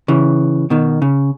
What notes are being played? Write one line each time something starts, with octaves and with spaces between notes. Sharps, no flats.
C#3 E3
B2 D#3
C#3